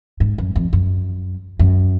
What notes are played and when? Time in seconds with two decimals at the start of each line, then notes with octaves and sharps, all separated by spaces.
0.20 G#2
0.38 F#2
0.55 F2
0.73 F#2
1.59 F#2